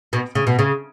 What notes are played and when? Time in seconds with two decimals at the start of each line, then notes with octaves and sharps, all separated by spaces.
0.13 B2
0.35 C#3
0.47 B2
0.59 C#3